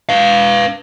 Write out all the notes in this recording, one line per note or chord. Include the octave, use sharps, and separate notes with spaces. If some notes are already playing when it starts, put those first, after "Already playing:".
B4 F5